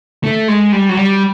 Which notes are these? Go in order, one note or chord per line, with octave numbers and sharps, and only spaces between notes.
A3
G#3
G3
F#3
G3